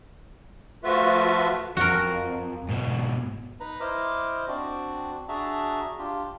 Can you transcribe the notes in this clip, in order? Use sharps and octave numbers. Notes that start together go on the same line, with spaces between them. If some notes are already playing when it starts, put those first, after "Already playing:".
F3 A3 F4 F#4 B4 E5
F2 F#4 A#4
G#2 B2
D#4 B4 A#5 B5
E4 C5 D#5 D6 F6
C4 D4 F#4 D5
D4 F#4 G#4 E5 A5 A#5
D4 F4 G4